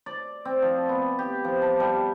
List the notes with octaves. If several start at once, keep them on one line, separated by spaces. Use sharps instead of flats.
D5
C4
F3
B3
G4
F3
A5
G3